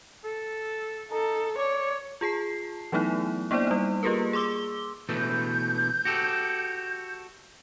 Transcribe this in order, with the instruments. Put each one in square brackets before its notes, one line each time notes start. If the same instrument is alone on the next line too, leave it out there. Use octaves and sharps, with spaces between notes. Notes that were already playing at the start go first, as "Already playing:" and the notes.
[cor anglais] A4
[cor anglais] D#4 [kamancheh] A4
[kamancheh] C#5 [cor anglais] D5
[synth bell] F4 G#4 A5 C7
E3 F#3 A3 B3 D#4 E4
A#3 B3 D4 E4 C5 D5
G3 D#4
A#3 F4 G4 G#4 A#4 B4
G#4 C6 D6 E6 G7
[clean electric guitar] B2 E3 A3 [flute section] G6
[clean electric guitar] F#4 G4 A4